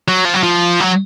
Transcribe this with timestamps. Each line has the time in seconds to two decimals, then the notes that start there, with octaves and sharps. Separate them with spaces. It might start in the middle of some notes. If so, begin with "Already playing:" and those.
0.08 F#3
0.25 F3
0.34 F#3
0.43 F3
0.80 F#3